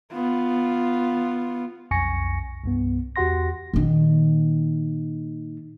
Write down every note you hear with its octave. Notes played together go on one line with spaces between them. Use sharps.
B3 F4
B1 F2 G#5 C#6 A#6 C#7
C2 G2 B3
E2 F#4 G4 F#5 C6 A#6
A#2 D#3